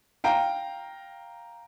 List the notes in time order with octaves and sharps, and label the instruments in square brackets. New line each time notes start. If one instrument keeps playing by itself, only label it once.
[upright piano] F5 G5 A#5